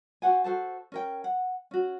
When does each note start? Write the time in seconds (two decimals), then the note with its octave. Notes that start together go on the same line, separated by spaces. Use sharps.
0.22 F#4 C5 F#5 G#5
0.44 F#4 A4 C5 A5
0.92 C#4 A#4 G5
1.24 F#5
1.71 C#4 F#4